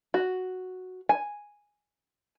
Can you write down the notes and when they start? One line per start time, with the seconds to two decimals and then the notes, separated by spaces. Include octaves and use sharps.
0.14 F#4
1.09 G#5